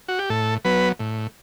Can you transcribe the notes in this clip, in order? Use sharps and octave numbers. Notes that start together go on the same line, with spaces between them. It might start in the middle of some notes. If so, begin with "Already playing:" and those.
F#4
G4
A2 A4
F#3 B3 B4
A2